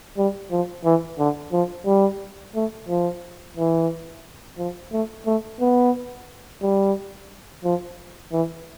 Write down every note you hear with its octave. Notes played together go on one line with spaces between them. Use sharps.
G3
F3
E3
D3
F3
G3
A3
F3
E3
F3
A3
A3
B3
G3
F3
E3